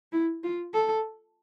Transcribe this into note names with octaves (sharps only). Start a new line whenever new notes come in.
E4
F4
A4